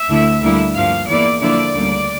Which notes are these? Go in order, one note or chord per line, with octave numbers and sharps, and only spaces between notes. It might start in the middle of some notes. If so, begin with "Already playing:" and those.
Already playing: E5
D2 D3 A3 E4
D2 D3 G3 A#3 E4
G2 F3 A#3 F5
E2 E3 A#3 E4 D5
D3 F3 A#3 E4 D5
D2 C#3 G3 A#3